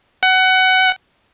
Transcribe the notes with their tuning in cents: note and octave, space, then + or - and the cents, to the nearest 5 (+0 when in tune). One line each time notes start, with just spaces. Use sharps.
F#5 +20